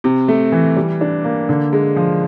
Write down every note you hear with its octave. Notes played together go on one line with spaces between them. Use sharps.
C3
A3
E3
G3
D4
A#3
D3
G#3
F3